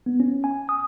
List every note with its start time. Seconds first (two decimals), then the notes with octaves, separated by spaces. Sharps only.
0.06 B3
0.20 C#4
0.44 G#5
0.69 D#6